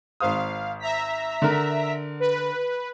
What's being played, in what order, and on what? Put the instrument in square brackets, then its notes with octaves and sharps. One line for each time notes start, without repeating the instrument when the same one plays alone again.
[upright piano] G#1 C5 D#6 [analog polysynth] F5
[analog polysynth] E5 A#5 B6
[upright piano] D3 A#4
[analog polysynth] B4